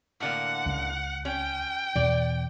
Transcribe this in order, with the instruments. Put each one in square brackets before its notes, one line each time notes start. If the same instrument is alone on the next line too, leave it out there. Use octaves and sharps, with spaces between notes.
[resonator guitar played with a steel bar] A2 D3 A#3 [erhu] F#5
[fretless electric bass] C#2
[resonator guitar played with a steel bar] C#4 [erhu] G5
[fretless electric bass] E2 B2 [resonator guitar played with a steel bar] D5